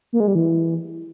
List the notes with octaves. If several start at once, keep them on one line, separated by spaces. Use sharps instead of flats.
A#3
G#3
G3
E3